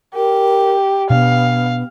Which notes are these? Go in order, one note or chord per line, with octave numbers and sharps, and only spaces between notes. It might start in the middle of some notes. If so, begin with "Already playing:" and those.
G4 A#4
B2 B3 D4 F5